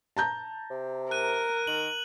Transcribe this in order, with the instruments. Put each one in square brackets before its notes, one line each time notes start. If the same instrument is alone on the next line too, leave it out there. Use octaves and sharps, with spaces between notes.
[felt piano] A5 A#5 G6
[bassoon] C3
[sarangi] A#4 [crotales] F#6 D#7
[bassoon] D#3 [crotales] F#7